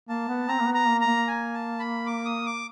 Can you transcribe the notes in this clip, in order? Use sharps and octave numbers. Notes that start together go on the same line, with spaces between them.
A#3 A5
B3
C4 A#5
A#3
B3
A#5
A#3
A#5
A#3
G#5
A5
B5
D6
D#6
D6